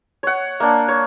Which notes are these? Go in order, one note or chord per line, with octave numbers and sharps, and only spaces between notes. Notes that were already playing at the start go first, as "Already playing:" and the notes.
C#5 F#5
A#3 D4
C#5